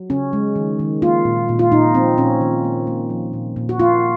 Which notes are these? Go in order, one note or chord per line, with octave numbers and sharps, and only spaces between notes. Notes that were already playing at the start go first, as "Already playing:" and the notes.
Already playing: F#3
C#3 C#4
G#3
D#3
D#3
A#3 F4
A#2
A#2
F4
A#2 D#4
F3 C4
A#2 C#4
D#3
A#3
A#3
F3
A#2
A#2
F#4
A#3 F4